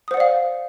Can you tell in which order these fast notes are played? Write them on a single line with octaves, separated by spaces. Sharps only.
D#6 C5 F#5 D5 F5